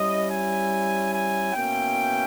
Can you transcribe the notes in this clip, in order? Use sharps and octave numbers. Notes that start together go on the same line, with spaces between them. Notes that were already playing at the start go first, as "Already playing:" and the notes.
Already playing: G3 C#4 E4 D#5
G#5
G#5
B2 A#3 C#4 E4 G5